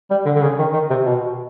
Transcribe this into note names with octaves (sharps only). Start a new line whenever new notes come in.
G3
D3
D3
C#3
D#3
D#3
C3
B2